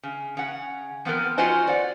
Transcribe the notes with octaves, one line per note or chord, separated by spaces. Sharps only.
C#3
C#3 F#5
F3 B3 C4 A#4
C#4 F4 F#4 C5 D#5 G#5
D5 F#5